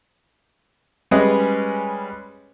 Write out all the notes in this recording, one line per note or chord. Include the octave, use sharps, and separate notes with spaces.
G3 G#3 C#4 G#4 B4 D#5